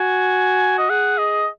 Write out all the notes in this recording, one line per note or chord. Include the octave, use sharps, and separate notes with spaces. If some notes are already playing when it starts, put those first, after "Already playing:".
Already playing: F#4 G#5
D#5
G#4 F#5
D#5